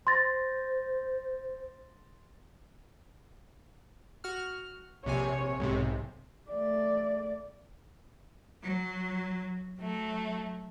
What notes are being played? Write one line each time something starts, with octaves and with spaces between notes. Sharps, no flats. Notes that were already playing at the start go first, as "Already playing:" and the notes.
C5 C6 A6 A#6
F#4 F6
A#1 C3 C#5 G#5
B1 G#2 C3
A3 D5
F#3
F#3 A3